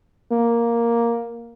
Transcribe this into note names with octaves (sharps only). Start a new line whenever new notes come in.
A#3